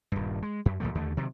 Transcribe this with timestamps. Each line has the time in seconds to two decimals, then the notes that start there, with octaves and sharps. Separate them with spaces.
0.12 D#1 G2
0.42 G#3
0.66 F#2
0.80 C#2 A#2 F3 A3
0.95 D#2 D3 A3
1.17 C3 D#3 F#3